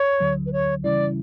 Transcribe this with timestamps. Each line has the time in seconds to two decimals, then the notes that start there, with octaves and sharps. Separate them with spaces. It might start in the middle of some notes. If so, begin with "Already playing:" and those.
Already playing: C#5
0.20 D2 D3 F#3
0.46 B4
0.53 C#5
0.84 C#3 E3 G3 C#4 E4 D5